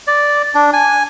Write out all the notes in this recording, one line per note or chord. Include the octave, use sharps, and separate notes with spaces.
D5
D4
G#5